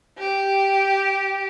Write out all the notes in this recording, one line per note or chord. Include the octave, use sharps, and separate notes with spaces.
G4